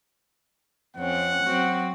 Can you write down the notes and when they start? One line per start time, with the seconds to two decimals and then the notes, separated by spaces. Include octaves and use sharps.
0.96 F2 C4 C#4 F#5
1.44 F#3 C4 F#4